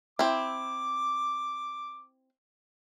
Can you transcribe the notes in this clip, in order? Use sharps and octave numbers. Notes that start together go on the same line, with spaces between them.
C4 E4 D6